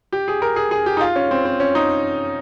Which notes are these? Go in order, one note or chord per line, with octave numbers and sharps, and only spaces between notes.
G4
G#4
A#4
G#4
G#4
G4
D#4
F4
C#4
C4
C4
C#4
D#4